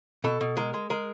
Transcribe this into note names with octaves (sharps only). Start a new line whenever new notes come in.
B2 A4
B2
G#3 A#4
G#3
G#3 A#4